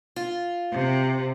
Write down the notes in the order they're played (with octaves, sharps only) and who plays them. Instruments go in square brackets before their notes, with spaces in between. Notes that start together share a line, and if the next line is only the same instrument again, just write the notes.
[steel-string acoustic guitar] F4
[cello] C3